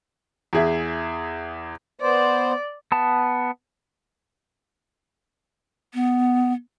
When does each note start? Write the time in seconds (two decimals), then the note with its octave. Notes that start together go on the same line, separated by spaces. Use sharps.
0.53 E2 G#4 E5
2.01 B3 C5 D5
2.92 B3 A5
5.94 B3